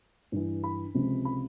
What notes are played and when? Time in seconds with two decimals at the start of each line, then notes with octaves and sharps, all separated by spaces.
0.32 G2 E3
0.64 B5
0.94 C#2 C3 F3
1.25 B5